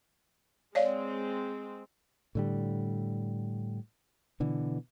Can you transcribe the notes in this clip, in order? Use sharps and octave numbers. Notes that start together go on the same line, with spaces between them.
G#3 C4 C#5 D5 F5
A2 D3 G3
B2 D3 E3